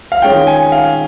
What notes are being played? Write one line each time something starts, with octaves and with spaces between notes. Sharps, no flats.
F5
D#3 G#3 C#4 F4 G5
G#5
F5